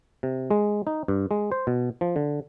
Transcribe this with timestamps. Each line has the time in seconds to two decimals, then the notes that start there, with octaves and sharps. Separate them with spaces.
0.23 C3
0.51 G#3
0.87 D#4
1.08 G2
1.31 G#3
1.52 C5
1.67 B2
2.01 F3
2.16 D3